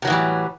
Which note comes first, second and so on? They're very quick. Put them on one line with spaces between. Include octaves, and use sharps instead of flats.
C3 F#3 A2 E3 G3